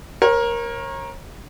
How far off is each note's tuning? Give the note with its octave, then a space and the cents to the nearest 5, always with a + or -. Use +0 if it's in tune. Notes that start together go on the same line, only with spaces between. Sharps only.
A#4 +15 C#5 -35